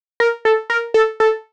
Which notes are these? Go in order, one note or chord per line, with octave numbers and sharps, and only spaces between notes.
A#4
A4
A#4
A4
A4